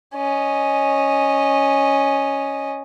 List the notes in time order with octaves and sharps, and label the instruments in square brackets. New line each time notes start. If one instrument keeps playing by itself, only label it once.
[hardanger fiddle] C#4 D#5